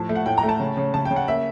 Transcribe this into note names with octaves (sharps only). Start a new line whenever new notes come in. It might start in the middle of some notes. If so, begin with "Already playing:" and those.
Already playing: A2 F3 A5
A3
F#5
A2 G5
A#5
A3
A5
C#3
C#3
C#3 A5
G5
C#3
F#5
A#3 E5